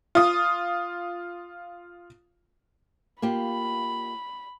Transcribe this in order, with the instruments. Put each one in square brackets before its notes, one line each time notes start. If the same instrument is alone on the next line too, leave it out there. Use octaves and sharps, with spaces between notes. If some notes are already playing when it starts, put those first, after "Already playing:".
[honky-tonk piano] F4 D#6
[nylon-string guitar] A#3 F4 G4 [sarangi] B5